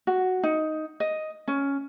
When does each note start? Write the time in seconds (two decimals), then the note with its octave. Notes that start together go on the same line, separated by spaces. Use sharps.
0.07 F#4
0.43 D#4
1.00 D#5
1.48 C#4